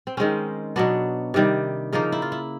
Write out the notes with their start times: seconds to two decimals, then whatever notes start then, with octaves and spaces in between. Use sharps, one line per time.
0.07 C4
0.17 D#3 G#3 C4 C#4
0.76 B2 F#3 B3 D4
1.34 C3 D#3 G3
1.93 C#3 F3 A#3 D#4
2.12 E4
2.22 F4
2.32 E4